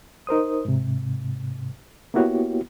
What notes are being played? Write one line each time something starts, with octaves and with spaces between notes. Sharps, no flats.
D#4 A#4 C5 D#6
G#2 C3
A#3 B3 E4 F#4 G4 C#5